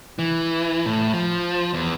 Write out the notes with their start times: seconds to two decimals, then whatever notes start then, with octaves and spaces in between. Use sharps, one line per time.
0.19 E3
0.86 A2
1.13 F3
1.74 E2